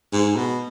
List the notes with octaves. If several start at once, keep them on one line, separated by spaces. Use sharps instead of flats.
G#2
B2